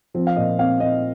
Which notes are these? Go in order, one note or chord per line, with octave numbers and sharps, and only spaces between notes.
F3 C4
F5
A#2 D#5
C4 F5
C4 D#5